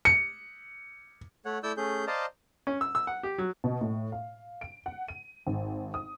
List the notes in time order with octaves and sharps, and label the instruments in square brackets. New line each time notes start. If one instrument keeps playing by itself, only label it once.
[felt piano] C#7
[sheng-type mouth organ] A3 C#5 F#5
A3 E4 D5 E6 G6
A3 C#4 G#4 G6
C5 D5 D#5 F5 A5 A#5
[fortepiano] C#4
E6
E6
F#5
G4
F#3
[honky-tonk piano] B2
A2
F5
D7
F#5
D#7
G#1
D#6